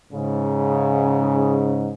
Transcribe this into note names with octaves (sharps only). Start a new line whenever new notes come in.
G#2 C#3